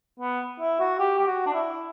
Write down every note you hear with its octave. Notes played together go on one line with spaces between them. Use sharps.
B3
E4
F#4
G4
G4
F#4
D4
E4